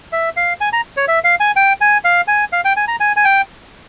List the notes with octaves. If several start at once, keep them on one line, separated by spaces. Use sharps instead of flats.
E5
F5
G#5
A#5
C#5
E5
F5
G#5
G5
G#5
F5
G#5
F5
G5
G#5
A#5
G#5
G#5
G5